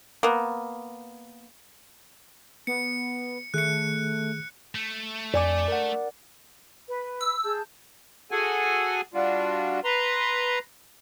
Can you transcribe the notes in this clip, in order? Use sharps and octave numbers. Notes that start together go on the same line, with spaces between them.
A#3 B3
B3 C#7
D#3 A3 G#4 F#6 C#7
A3
F2 D5 G#5 D6
A#4 F#5
B4
E6
G#4 A5 G6
F#4 G#4 A4 F#5 G#5
G3 D4 F4 F#4
B4 A#5 C6